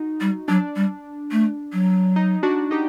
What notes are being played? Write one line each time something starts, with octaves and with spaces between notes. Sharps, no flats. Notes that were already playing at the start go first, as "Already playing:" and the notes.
Already playing: D#4 F#4
G3
F#3 D4
G3
A3
F#3
D#4
D4 F#4
D#4 G4